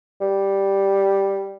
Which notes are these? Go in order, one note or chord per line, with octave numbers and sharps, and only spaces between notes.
G3